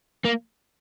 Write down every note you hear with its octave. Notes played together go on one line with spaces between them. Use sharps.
A#3